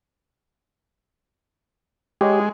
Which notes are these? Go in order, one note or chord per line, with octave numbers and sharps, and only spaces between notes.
G#3 G4 C#5 D#5